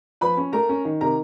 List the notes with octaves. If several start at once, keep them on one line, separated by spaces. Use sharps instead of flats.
F3 B4 B5
C#4
A3 A#4 A#5
C#4
D#3
C3 A#4 A#5